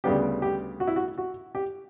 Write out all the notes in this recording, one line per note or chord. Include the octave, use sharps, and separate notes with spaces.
D2 C#3 G3 B3 G4
G4
F#4
E4
F#4
F#4
G4